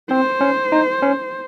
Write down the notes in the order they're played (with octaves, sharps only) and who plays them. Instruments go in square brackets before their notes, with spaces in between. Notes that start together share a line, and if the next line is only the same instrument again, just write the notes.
[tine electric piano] C4 [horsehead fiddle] C5
[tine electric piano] C#4
D#4
C#4